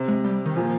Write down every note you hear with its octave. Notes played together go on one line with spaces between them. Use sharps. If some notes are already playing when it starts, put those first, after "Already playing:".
Already playing: C3
G#3
G3
D#3
A#2 F3